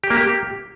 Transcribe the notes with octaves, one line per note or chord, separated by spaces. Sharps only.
G4
A#3
G4